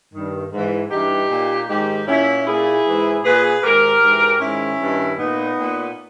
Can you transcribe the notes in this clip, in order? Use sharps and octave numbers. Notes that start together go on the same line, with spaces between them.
G2 D#3
G#2 E3
G2 E3 D#4 G4
A#2
G#2 D#3 D#4 G4
A#2 C#4 E4
A#2 E4 G#4
G#2 E3
A#2 G#4 B4
G#2 D#3 G4 A#4
G#2 E3
G#2 D#3 C#4 E4
G2 D#3
A#2 B3 D#4
A#2